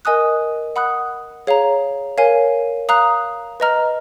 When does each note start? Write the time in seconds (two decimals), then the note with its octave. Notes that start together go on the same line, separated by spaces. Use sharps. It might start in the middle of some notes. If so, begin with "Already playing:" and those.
0.05 A#4 D#5 G#5 D#6 F#6
0.76 F#5 B5 D#6 F#6
1.47 G#4 C#5 F5 A#5
2.18 A#4 C#5 F5 G#5
2.89 F5 A#5 D#6 F#6
3.60 B4 D#5 A#5 F6